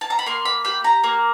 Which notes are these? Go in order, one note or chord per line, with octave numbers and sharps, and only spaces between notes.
A5
A#5
B5
A#3 C6
B5
G4 B5
A#5
A#3